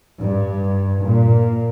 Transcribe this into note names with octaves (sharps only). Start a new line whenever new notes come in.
G2
A#2